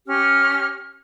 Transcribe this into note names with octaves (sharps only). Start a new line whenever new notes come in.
C#4 G4 F6